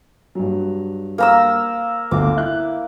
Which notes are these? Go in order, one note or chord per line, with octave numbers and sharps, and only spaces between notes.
G2 F#3
A#3 A#5 E6
G1 D2 D6
E4 F#6